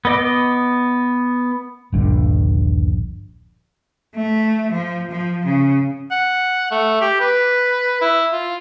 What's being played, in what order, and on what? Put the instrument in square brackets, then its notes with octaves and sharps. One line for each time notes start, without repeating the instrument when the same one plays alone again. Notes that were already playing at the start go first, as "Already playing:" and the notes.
[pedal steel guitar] B3 D#5 D6
[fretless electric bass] D#1 A#1 G2 D3
[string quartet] A3
F3
F3
C#3
[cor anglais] F#5
A3
G4
B4
E4
F4